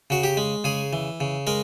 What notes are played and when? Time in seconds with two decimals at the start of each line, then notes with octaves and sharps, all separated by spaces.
0.10 C#3 F#4
0.24 G4
0.37 G#3
0.64 C#3 G#4
0.93 E3
1.20 C#3
1.47 G#3 A#4